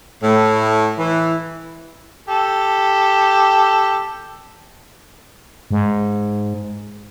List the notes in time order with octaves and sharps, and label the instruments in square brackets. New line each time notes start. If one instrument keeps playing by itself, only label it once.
[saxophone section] A2
E3
[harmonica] G4 A4
[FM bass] G#2